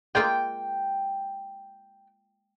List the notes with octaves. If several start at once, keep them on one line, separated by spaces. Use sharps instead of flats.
G#3 A#3 F4 G5